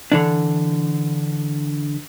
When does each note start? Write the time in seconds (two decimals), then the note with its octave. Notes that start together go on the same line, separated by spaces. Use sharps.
0.12 D3 E3 D4